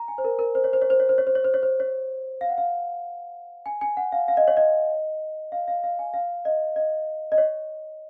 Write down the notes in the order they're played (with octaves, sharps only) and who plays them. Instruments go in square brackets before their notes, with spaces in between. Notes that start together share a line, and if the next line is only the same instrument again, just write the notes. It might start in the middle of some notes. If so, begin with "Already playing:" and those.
Already playing: [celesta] A#5
G#5
C5
A#4
A#4
C5
C#5
C5
C#5
C5
C#5
C5
C#5
C5
C#5
C5
C#5
C5
C#5
F5
F#5
F5
G#5
G#5
F#5
F5
F5
D#5
C#5
D#5
F5
F5
F5
G#5
F5
D#5
D#5
D#5
C#5